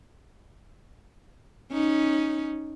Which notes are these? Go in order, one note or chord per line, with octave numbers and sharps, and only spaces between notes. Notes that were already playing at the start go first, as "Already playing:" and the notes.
C#4 D#4